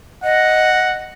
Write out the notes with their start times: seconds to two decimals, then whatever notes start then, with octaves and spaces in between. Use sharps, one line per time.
0.24 D#5 F#5